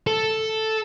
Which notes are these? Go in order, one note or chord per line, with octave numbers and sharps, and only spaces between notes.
A4